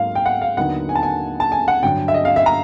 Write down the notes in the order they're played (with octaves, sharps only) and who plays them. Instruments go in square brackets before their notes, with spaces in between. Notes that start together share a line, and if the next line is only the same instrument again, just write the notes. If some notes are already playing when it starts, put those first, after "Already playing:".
Already playing: [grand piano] G#2 F#3 A#3 F5
G5
F#5
F5
D#2 D3 F#3 B3 D#4 F#5
G#5
A5
G#5
A5
G#5
F#5
G2 D3 F#3 G5
E5
D#5
F5
E5
A#5